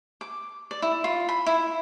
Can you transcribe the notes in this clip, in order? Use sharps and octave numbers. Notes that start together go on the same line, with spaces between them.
D6
D5
E4
F4
B5
E4